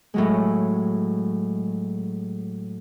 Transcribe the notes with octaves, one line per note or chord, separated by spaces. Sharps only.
A2 F#3 G#3